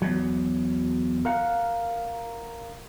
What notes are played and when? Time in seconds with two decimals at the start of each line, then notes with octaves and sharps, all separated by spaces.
0.02 E2 F#3
1.25 A#4 F5 F#5